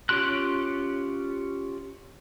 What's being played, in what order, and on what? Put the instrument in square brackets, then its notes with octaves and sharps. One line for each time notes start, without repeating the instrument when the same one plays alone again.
[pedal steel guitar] C#4 F4 G4 C6 F#6